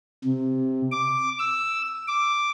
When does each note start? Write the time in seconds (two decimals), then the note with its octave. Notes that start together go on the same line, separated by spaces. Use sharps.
0.25 C3
0.92 D6
1.39 E6
2.08 D6